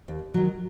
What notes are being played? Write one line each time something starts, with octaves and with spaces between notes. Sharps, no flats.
D#2
D#3 F#3